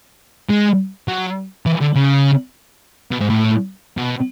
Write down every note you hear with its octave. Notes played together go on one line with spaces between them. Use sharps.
G#3
F#3
E3
D3
C#3
B2
G#2
A2
B2